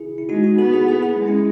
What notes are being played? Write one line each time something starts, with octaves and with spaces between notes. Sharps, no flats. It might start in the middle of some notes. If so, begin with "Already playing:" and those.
Already playing: E4 G#4
E4
G#3 D#4 F#4
D#4 F#4
B3 F#4 A4
E4 G#4
E4 G#4
E4 G#4
G#3
C#4 E4